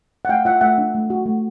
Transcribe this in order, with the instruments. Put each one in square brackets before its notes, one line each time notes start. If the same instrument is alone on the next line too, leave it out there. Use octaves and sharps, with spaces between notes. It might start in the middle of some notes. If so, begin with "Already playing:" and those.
[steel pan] F#5
A3 F5 G5
F4 E5 F#5
A3 E5 F#5
D4
A3
F#4
A3